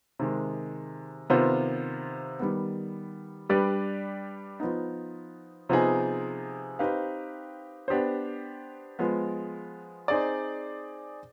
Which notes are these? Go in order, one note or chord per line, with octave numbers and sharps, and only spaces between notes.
C3 D#3 G#3
C3 D#3 B3 F4 C5
D#3 G3 B3
G3 D4 G4 B4 D5
F3 B3 D#4
C3 F3 B3 D#4 G#4
C4 D#4 G4 B4 F5
B3 D4 G4 C5
F3 G#3 B3
C4 D#4 G#4 D5